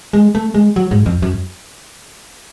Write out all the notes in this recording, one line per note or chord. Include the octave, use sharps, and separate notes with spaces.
G#3
A3
G#3
F#3
G#2
F2
F#2